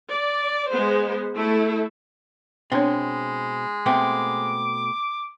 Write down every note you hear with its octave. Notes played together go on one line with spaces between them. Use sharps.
D5
G#3 B3 C5
A3 E4 A4
B2 G#3 B3 C4 D4 C#5
B2 A3 C4 G5 D6